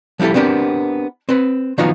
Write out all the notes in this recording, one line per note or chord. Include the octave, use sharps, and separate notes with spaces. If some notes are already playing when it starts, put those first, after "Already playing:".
F3 G3 E4 G4 A4
B3 C4 D4 G4 A#4
C4 B4
D#3 F3 F#3 B3 D#4 F4